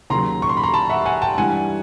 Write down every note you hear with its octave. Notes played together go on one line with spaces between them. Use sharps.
D#2 C#3 F#3 A#5 C6
C#6
C6
B5
A#5 C6
A5 B5
E5 F#5
F#5 G#5
G5 A5
G2 E3 G3 F#5 G#5